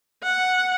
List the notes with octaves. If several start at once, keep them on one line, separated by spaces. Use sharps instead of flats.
F#5